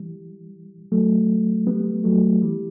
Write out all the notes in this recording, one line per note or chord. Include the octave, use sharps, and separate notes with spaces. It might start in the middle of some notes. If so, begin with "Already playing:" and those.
Already playing: E3 G3
F#3 A3
G3 B3
F#3 A3
E3 G3